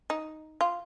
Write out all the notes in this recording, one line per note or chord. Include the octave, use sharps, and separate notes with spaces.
D#4
F4